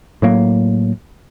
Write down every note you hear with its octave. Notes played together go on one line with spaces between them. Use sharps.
A2 F#3 A#3